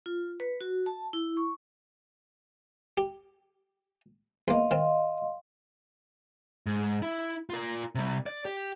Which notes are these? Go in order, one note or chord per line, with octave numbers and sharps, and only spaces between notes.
F4
B4
F#4
A5
E4
C#6
G4
E2 A#3 D#5 F5 C6
D#3 C4
G#2
E4
F4 A#4
C3 G3
D5
G4